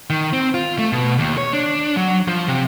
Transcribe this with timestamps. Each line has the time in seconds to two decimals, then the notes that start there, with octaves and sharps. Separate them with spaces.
0.10 D#3
0.33 C4
0.54 F4
0.79 A3
0.92 B2
1.19 D#2
1.38 C#5
1.53 D4
1.97 F#3
2.28 F3
2.48 C3